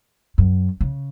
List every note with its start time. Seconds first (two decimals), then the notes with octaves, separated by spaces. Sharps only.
0.38 F#2
0.81 C#3